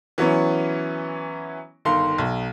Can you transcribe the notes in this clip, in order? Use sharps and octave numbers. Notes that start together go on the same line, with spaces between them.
E3 F#3 B3 C#4 E4
G1 D#3 F5 C6
B1